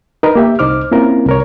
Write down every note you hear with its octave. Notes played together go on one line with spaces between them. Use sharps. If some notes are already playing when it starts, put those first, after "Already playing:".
D#4 A#4 B4
A#3 G4 E5
C2 D#4 C5 D6 F6
A#3 C4 C#4 E4 F4 A#4
C2 A#4 C#5